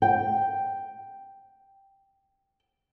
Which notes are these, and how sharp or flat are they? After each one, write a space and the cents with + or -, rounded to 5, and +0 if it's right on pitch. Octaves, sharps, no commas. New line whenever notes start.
G5 +0